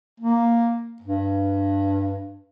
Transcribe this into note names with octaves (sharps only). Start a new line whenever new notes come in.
A#3
G2